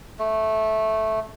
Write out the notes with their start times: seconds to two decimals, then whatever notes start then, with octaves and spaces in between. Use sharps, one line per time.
0.19 A3